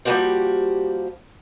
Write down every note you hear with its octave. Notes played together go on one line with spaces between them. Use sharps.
F3 G3 A#3 F#4 G4 C5